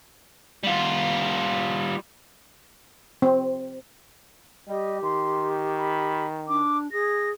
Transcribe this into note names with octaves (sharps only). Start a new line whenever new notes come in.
G3 F4
C4
G3 G4 D#5
D#3 C6
B5
D4 D6
G#4 A#6